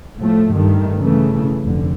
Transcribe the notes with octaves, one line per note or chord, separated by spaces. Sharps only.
A2 F3 A3
G2 D#3 A3
C#3 E3 A3
F1 D3